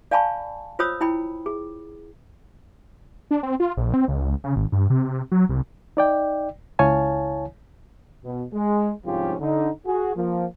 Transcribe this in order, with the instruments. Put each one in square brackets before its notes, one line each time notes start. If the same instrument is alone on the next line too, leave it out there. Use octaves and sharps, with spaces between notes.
[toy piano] D5 F5 G#5 A5 B5 C#6
F4 C5 C#5 B5 D#6 E6
E4 G5 B5
G#4
[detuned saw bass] D4
C4
F4
A#1
C4
C#2
C#3
G#1
G2
C3
F#3
C2
[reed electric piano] D#4 D5 G5
C#2 E4 C#5 F5 G#5 A5
[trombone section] B2
G#3
C2 G#2 F3 C#4 F4 G4
D3 D#4
F#4 G#4
F3 A#3